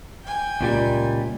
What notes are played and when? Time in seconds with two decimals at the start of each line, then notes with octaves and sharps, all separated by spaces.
0.24 G5 G#5
0.61 C#2 A#2 G3